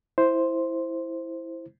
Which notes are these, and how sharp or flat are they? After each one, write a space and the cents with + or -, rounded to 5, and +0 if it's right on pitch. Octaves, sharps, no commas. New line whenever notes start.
E4 +0 C5 +0